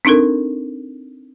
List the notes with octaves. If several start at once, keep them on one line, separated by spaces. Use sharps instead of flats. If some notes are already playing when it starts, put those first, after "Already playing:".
C4 D4 D#4 A4 A#4